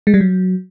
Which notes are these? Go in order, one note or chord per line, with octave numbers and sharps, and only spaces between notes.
G#3
G3
F#3